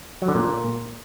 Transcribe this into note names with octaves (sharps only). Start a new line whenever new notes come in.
F#3
D3
A#2